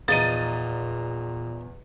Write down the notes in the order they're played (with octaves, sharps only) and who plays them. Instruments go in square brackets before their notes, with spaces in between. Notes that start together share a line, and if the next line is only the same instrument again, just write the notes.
[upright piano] E2 [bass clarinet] A#2 [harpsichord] F3 D#4 [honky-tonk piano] A6 D#7